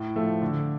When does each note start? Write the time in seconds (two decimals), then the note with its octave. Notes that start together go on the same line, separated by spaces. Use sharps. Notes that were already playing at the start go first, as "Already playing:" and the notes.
Already playing: A2
0.16 F3 A3
0.42 D3